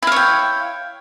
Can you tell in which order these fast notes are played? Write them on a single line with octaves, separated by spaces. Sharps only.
E4 F5 C#5 G5